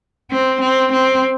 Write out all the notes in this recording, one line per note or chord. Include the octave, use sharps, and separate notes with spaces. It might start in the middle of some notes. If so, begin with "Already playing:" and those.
C4
C4
C4